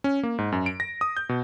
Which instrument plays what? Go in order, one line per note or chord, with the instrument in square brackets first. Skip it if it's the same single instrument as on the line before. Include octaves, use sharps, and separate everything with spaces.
[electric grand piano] C#4
A#3
G#2
F#2
D7
A#6
D#6
G6
B2